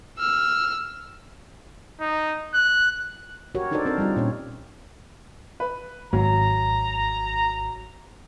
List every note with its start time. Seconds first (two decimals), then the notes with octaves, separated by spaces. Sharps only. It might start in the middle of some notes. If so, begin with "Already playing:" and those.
0.19 E6 F6
2.01 D#4
2.54 F#6
3.55 F#4 G4 A#4 C#5
3.71 D4 D#4 A4 A#4 C5 D5
3.85 C4 D4 A#4
3.98 G3 D#4 F4
4.16 A#2 C#4 C#5
5.60 B4
6.13 G#1 F#3 A#5